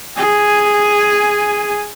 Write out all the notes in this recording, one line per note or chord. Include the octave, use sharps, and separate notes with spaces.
G#4 G#5